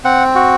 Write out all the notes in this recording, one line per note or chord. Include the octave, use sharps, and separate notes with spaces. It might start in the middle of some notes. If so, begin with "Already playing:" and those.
C4 F#5
F#4